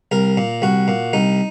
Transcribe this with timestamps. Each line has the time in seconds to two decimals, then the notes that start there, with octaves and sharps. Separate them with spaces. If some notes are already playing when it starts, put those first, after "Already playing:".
0.11 C2 A#4
0.37 A#2
0.62 C2 F#4
0.88 A#2
1.13 C2 D#4